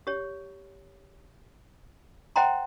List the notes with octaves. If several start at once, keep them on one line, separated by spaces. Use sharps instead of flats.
G4 C#5
C5 D#5 F#5 G5 A#5 C6